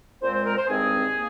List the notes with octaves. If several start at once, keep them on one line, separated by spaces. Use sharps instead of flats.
A#2 G#3 C4 C5
C5
A#4
C5
G2 D#3 G#3 C4 G#4
A#3